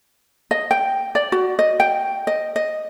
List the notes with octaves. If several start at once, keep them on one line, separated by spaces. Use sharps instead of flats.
D#5
G5
D5
F#4
D#5
G5
D#5
D#5